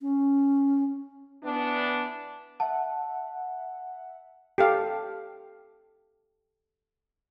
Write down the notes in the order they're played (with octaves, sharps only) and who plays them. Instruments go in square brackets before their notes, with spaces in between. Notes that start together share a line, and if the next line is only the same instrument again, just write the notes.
[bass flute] C#4
[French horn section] E3 B3 D4
[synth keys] E5 F#5 [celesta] A5
[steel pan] G4 A4 F5